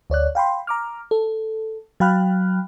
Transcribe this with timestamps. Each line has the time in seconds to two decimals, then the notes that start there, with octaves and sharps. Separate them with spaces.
0.10 D2 C#5 D5 F#6
0.35 F5 G5 B5 C6
0.67 A#5 D6 F6
1.11 A4
2.00 F#3 F5 G5 B5 F6 F#6